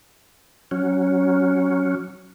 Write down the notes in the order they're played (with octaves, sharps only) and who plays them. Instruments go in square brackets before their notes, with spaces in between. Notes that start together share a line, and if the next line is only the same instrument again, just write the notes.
[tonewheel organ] F#3 C#4